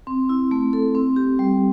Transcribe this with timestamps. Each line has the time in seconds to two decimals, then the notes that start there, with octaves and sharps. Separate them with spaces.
0.07 C4
0.29 E4
0.51 A3
0.73 A4
0.95 C4
1.16 G4
1.39 G3